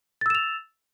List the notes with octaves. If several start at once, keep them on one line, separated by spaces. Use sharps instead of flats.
E6 A6 E7 F7